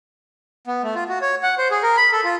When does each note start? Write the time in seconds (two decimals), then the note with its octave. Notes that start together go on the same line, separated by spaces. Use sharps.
0.67 B3
0.83 A3
0.95 F4
1.09 F#4
1.21 C#5
1.43 F#5
1.58 C5
1.71 G#4
1.83 A#4
1.97 B5
2.12 A4
2.24 F4